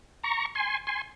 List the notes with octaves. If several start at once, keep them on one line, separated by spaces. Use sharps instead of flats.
A#5 C#6
G#5 C6
G#5 C6